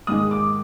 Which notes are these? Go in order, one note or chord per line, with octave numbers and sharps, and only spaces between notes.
G#2 D#3 G#3 D#6
D6